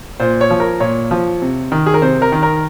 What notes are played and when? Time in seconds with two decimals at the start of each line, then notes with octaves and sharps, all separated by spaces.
0.20 A#2 C5
0.41 C#5
0.51 F3
0.60 A#4
0.80 A#2 C#5
1.11 F3
1.42 C3
1.72 D#3
1.86 G#4
1.94 A#4
2.02 C3 C5
2.22 A#4
2.32 D#3
2.43 A#4